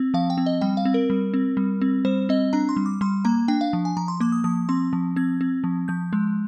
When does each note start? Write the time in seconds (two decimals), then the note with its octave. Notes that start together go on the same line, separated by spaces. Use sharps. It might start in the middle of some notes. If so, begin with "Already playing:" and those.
Already playing: C4
0.14 F3 F5
0.30 G5
0.37 C4
0.46 D#5
0.61 G3 G5
0.77 F5
0.85 C4
0.94 A#4
1.10 G3
1.34 C4
1.57 G3
1.81 C4
2.05 G3 C5
2.29 C4 D#5
2.53 D4 A#5
2.69 C6
2.77 G3
2.86 D6
3.01 G3 C6
3.25 A#3 A#5
3.48 D4 G5
3.61 F5
3.73 F3
3.85 G#5
3.97 F3 A#5
4.08 C6
4.20 A#3 D6
4.32 D#6
4.44 F3 D#6
4.69 C4 C6
4.93 F3
5.16 C4 G#6
5.41 C4
5.64 F3
5.88 F3 G6
6.13 G#3